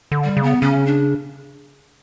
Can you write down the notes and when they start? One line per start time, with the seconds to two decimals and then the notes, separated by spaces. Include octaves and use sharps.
0.12 D3
0.24 G3
0.37 C#3
0.43 B3
0.62 C#3 C#4
0.87 D4